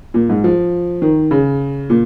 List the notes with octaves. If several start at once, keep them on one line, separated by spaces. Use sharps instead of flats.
A#2
G#2
F3
D#3
C#3
A#2